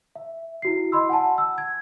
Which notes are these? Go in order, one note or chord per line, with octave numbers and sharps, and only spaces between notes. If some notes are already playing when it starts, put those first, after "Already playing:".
E5
E4 F#4 C7
D#5 B5 C6 E6
F#5 G#5 A5
E6
G#6